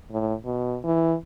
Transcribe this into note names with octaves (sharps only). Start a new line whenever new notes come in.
A2
B2
E3